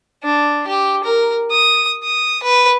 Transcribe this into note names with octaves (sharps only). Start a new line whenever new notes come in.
D4
G4
A#4
D#6
D#6
B4